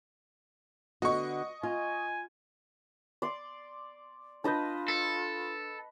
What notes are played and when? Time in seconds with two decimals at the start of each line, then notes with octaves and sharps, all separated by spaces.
1.02 D3 B3 F#4 D#5 C#6
1.63 F4 G#5
3.22 D5 C6
4.44 D4 F4 B4 D#5 A5 G6
4.88 A4